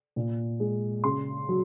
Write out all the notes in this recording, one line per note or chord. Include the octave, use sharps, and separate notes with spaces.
A#2
G#3
C#3 C6
F#3